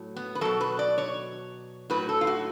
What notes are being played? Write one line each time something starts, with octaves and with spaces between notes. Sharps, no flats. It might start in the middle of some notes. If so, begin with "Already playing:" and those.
Already playing: A2 F#3
B3
B4
B2 F#3 A4
B4
D5
C#5
A2 F#3 B4
A4
F4
F#4